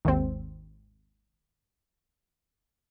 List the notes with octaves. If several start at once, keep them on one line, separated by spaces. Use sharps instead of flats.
G#1 D#2 C4